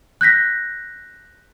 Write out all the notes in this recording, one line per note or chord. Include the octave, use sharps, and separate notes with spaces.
F#6 G6 A#6 B6